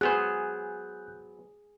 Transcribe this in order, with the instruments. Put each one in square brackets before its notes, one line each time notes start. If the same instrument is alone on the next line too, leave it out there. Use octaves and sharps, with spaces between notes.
[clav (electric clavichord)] F#3 B3 C5 [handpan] G#4 [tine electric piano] F#6 G6